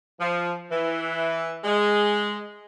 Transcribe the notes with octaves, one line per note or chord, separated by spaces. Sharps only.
F3
E3
G#3